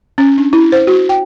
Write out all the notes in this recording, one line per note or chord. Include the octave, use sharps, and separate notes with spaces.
C#4
D4
E4
C5
F#4
G5